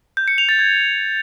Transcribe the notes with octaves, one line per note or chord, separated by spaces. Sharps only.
G6
C#7
F7
A6
G#6